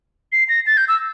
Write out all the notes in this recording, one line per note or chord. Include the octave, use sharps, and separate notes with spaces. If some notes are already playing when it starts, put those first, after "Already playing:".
C7
A#6
A6
G6
E6